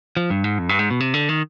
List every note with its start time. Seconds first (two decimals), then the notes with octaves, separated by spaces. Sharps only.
0.17 F3
0.30 G2
0.44 G#2
0.59 F2
0.69 G2
0.79 G#2
0.90 B2
1.00 C3
1.14 D3
1.29 D#3